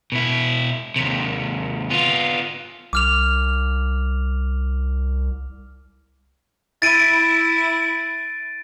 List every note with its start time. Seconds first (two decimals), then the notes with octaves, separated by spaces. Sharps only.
0.12 B2 E4
0.96 D#2 C3
1.90 B3 F4
2.93 C2 D6 F6 F7
6.82 E4 A6 D7 D#7